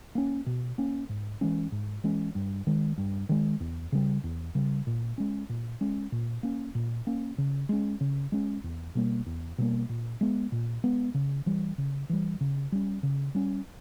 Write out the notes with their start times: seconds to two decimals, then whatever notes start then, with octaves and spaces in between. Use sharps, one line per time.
0.15 A#3 C#4
0.46 B2
0.78 A#3 C#4
1.09 G#2
1.41 E3 G#3 C#4
1.72 G#2
2.04 E3 G#3 C#4
2.35 G2
2.67 D#3 G#3
2.98 G2
3.29 D#3 G#3
3.60 E2
3.92 C#3 G3
4.24 E2
4.55 C#3 G3
4.87 A#2
5.18 G#3 C#4
5.49 A#2
5.81 G#3 C#4
6.12 A#2
6.43 A#3 C#4
6.75 A#2
7.07 A#3 C#4
7.38 C#3
7.69 G#3 C#4
8.01 C#3
8.32 G#3 C#4
8.64 E2
8.95 B2 G3 A#3
9.26 E2
9.58 B2 G3 A#3
9.89 A#2
10.21 G#3 B3
10.52 A#2
10.84 G#3 B3
11.14 C#3
11.46 E3 G3
11.78 C#3
12.09 E3 G3
12.41 C#3
12.72 G3 C#4
13.03 C#3
13.35 G3 C#4